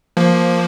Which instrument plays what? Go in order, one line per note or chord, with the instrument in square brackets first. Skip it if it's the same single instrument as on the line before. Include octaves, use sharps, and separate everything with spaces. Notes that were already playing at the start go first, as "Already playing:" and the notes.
[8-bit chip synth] F3 A#3